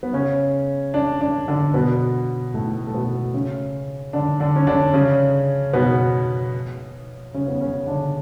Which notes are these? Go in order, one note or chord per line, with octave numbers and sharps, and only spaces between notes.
B3
C#3 C#4
D4
D4
D3 D4
B2 B3
A2 A3
A3
B2 B3
C#3 C#4
D3 D4
D3 D4
C#4
D3 D4
C#3 C#4
B2 B3
C#3 C#4
B3
C#3 C#4
D3 D4